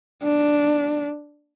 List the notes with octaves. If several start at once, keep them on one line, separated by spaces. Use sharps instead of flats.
D4